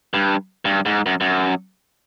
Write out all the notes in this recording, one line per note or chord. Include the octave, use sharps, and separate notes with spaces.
G2
G2
G#2
F#2
F#2